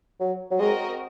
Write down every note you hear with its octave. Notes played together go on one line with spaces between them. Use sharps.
F#3
F#3
G#3 C4 F#4 A#4 D#5